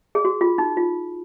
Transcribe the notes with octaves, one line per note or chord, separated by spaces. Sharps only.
G#4
F#4
F4
D#4
F4